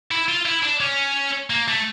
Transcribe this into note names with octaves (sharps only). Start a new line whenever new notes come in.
E4
F4
E4
D4
C#4
A#3
A3